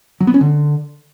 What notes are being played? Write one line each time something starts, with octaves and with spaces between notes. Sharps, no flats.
F#3
B3
C#4
D3